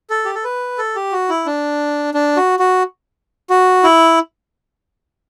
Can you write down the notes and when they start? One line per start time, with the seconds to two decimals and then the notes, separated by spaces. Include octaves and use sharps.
0.10 A4
0.25 G4
0.35 A4
0.44 B4
0.78 A4
0.96 G4
1.12 F#4
1.29 E4
1.46 D4
2.14 D4
2.37 F#4
2.59 F#4
3.50 F#4
3.84 E4